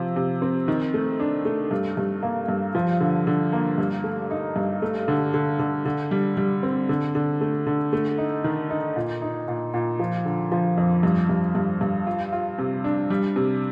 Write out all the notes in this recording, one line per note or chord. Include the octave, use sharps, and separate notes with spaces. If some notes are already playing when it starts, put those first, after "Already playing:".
Already playing: C3 F3
C3
C4
D#3
A3
D4
A3
G2
G2
A#3
G2
F3
D3
D3
A#3
G2
A3
D#4
G2
A3
D3
D3
D3
D3
G3
G3
C4
D3
D3
A3
D3
A3
D#4
D#3
D#4
A#2
D#4
A#2
A#2
F3
D3
F3
F2
G2
G2
G2
G2
F4
F4
C3
D4
G3
C3